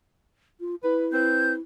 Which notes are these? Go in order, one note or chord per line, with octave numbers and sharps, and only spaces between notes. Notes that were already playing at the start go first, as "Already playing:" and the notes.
F4
E4 B4
C4 B4 G6